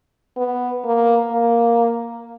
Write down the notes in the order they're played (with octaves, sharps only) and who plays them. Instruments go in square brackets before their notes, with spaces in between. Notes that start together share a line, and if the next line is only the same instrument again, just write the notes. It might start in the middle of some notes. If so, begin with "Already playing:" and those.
[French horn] B3
A#3
A#3